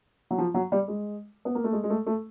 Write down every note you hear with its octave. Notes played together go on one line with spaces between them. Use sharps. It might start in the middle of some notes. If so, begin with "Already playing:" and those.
F#3
F3
F#3
G3
G#3
B3
A#3
A3
G#3
G#3
A3
A3